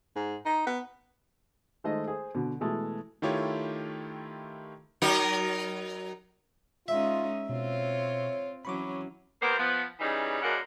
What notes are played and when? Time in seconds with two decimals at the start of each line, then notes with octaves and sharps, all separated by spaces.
0.16 G#2
0.46 D#4
0.67 B3
1.84 D#3 G#3 A3 C5 D#5
2.08 G#4 C5
2.35 B2 D3
2.60 B2 E3 G#3 A3
3.22 D#3 A3 E4 F4 G4 C#5
5.02 F#3 D#4 A#4
6.88 G#3 C#4 D#4 F4 E5
7.49 B2 C4 F4 C#5
8.65 E3 F#3 C#4 B5 C#6 D6
9.42 D#2 A#3 B3 A#4 C5
9.59 F3 B3
10.00 C#3 E3 G3 D#4
10.42 F#2 C#3 A#3 D4 D#5 F#5